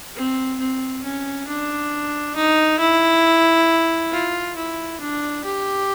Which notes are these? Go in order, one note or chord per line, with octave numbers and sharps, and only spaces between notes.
C4
C4
C#4
D4
D#4
E4
F4
E4
D4
G4